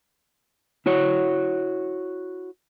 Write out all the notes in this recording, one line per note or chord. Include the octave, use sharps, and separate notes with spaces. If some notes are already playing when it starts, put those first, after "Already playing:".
E4 F#4 C#5